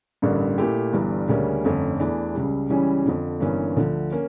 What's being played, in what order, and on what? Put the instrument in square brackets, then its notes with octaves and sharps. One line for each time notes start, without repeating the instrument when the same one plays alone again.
[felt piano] A1 G2 D3 G3 A#3
A#2 A3 E4 G4
G1 G2 E3 G3 D4
D2 C#3 G3 A#3 C#4
G1 F2 D3 A3 C#4
E2 E3 A3 D4
C#2 C#3 G3
C#2 C#3 E3 G3 C#4
F2 D3 F3
G1 G2 E3 A#3 C#4
D2 D3 F3
A#3 C#4